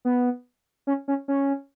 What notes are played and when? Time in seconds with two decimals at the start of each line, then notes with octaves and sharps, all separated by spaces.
0.05 B3
0.87 C#4
1.08 C#4
1.28 C#4